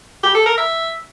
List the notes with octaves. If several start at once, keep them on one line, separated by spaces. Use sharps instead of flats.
G4
A4
A#4
E5